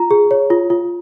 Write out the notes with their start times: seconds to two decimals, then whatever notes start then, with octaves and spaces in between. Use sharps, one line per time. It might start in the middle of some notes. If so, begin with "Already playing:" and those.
Already playing: F4 A#5
0.11 G#4
0.31 C#5
0.50 F4
0.70 F4